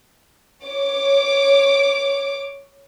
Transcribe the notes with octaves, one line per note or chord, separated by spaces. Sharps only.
C#5 D6